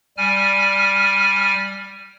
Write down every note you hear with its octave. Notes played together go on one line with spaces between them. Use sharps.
G3 G#5 F6